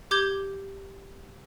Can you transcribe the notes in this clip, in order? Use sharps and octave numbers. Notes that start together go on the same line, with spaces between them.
G4 D6 G6 G#6 G7